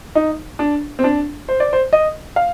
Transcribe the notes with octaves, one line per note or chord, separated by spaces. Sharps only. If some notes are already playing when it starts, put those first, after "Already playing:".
D#4
D4
C4
D4
C5
D5
C5
D#5
F5